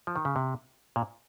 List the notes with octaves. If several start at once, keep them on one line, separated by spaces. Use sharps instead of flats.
F3
D#3
C#3
C3
A#2